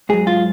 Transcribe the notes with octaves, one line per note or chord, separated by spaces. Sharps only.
G#2 F#3 G#4
F4